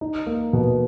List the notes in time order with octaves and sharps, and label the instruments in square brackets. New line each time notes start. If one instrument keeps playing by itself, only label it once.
[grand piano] D#4
A#3
B2